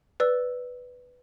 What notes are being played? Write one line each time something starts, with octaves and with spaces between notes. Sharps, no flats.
B4 D5 E6